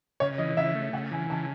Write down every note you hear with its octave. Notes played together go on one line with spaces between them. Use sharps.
C#3 C#5
E3 D#5
C#3 E5
A3
C#3 F#5
E3 G#5
C#3 A5